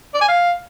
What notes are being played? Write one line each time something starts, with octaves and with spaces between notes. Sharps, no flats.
D5
G#5
F5